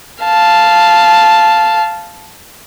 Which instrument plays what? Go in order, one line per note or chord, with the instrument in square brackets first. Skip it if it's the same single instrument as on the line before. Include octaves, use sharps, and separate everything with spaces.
[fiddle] F5 A5